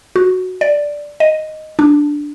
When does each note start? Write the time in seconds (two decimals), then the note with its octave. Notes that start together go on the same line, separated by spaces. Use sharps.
0.16 F#4
0.61 D5
1.20 D#5
1.79 D4